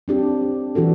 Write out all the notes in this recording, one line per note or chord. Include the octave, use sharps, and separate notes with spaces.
C4 D4 G4
E3 D4 F#4 A4